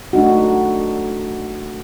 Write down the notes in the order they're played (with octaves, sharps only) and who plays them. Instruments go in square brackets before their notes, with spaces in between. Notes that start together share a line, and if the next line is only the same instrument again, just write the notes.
[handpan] A3 D4 D#4 F#4